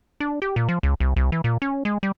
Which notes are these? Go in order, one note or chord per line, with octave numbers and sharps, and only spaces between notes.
D4
G4
A#2
F3
C#2
C2
C2
E3
A#2
C#4
G#3
G3